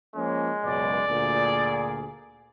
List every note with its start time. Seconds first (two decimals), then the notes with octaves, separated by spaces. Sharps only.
0.15 F3 G#3 A#3 C#4
0.64 C#2 F#2 B2 D5
1.08 D2 A#2 G#4